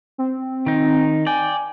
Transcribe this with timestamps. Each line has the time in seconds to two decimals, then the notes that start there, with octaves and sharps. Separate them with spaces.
0.18 C4
0.67 D#3 D#4
1.26 D5 G5 G#5